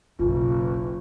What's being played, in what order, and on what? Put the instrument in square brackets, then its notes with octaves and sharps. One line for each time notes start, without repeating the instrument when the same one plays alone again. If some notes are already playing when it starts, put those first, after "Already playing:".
[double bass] F#1 [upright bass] B1 [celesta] F4